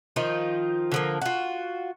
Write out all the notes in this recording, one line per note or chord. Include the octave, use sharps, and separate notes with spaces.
D#3 F3 D#4 F4
D3 F3 A#3
F4 F#4